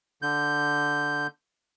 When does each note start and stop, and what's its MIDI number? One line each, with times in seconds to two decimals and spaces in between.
0.22 1.27 50
0.22 1.27 91